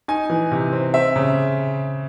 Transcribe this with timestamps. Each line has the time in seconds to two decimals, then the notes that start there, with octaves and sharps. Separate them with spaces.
0.08 D#4 G#5
0.30 E3
0.51 C3
0.73 C4
0.94 C4 E5
1.16 C#3